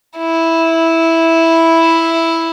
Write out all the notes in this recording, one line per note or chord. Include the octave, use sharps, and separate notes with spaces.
E4